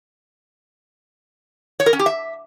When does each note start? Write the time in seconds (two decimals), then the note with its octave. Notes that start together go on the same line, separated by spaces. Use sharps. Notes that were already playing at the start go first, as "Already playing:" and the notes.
1.80 C#5
1.86 A#4
1.93 C#4
1.99 G4
2.06 E5